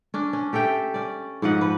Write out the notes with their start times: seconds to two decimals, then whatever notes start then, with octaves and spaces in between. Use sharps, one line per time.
0.14 C#4 D4
0.33 C#4
0.53 G4 A4 E5 G5
0.94 C#4 D5
1.42 G#2 F3 D#5 F#5
1.61 B4